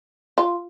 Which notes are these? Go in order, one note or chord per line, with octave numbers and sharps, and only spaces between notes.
F4